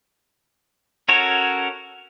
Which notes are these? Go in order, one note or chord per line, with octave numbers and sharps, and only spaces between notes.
C#4 F#4 A4 A#4 C#5